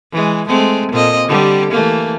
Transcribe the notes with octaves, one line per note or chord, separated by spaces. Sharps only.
E3 G#3
G#3 A3 C4
A#2 C4 D#5
D3 G3 G4
E3 A3 A#3